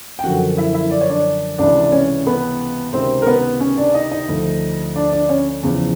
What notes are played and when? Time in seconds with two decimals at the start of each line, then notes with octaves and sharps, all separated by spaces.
0.19 G5
0.24 F#2 D3 F3 F#4 F#5
0.57 E4 E5
0.74 E4 E5
0.91 D5
1.01 C#5
1.09 D4 D5
1.58 C#2 C3 E3 D4 D5
1.85 D5
1.92 C#4 C#5
2.27 B3 B4
2.93 C#2 C3 D#3 C4 C5
3.22 A#4
3.27 B3 B4
3.60 C#4 C#5
3.77 D4 D5
3.94 D#4 D#5
4.11 D#4 D#5
4.28 D2 D3 F3
4.96 D4 D5
5.13 D4 D5
5.29 C#4 C#5
5.63 E2 C#3 F3